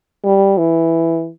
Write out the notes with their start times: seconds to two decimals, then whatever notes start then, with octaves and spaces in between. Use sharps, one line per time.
0.24 G3
0.58 E3